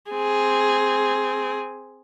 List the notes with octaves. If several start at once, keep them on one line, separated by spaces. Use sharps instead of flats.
C4 G#4